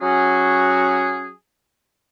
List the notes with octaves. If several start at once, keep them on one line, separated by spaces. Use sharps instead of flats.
F#3 C#4 F#4 G#4